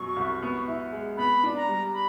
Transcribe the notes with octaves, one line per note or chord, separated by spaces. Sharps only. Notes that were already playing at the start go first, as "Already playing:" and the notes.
Already playing: F#2 B2 F#3 C#6
C2
B3
E4
G#3
B3 B5
D4
A#5
G3
B5